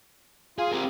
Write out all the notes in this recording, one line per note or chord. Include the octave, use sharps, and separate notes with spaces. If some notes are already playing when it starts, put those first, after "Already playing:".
F4 G#4 F5
C4 G4 A#4